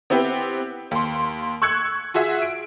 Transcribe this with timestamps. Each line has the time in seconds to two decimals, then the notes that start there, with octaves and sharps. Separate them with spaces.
0.10 B3 C4 E4 G4 B4
0.91 D#2 C6
1.62 C#6 E6 F#6 G#6 C#7
2.14 F4 F#4 G#4 E5
2.42 D7